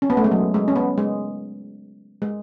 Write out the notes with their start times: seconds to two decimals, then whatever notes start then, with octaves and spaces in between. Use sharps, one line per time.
0.02 C#4
0.10 B3
0.17 A3
0.24 G#3
0.31 F#3
0.54 G#3
0.68 C#4
0.76 B3
0.98 G#3
2.22 G#3